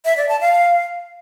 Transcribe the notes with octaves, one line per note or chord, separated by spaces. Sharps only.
E5
D5
A5
F5